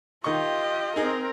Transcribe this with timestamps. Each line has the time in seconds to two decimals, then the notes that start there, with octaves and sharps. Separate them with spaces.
0.24 D#3 F4 G4 D#5 C#6
0.96 C4 D#4 G#4 A#4